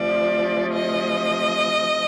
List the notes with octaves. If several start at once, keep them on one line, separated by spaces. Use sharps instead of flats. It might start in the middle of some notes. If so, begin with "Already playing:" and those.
Already playing: D2 C3 F3 D5
D#5